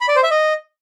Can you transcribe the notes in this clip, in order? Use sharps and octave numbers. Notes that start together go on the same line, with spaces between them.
B5
D5
C5
E5
D#5